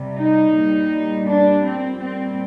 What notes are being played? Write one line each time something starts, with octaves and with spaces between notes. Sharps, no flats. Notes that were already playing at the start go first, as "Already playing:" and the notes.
Already playing: C3 G3
D#4
A#2 G3
D4
C4
A#2 G3 C4